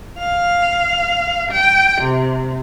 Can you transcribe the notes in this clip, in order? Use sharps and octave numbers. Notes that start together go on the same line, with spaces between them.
F5
G5
C3